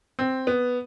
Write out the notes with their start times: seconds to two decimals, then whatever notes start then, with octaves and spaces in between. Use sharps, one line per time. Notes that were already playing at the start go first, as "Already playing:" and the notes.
0.19 C4
0.47 B3